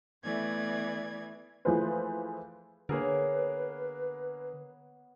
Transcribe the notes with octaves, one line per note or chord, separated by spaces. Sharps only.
E3 A3 B3 D5 G#6
E3 F3 A3 G#4 B4 C5
D3 A#3 B3 G#4 A#4 B4 C#5